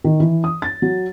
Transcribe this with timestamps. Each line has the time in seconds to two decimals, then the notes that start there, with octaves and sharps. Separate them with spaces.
0.04 D#3
0.20 E3
0.44 D#6
0.62 A6
0.82 F#3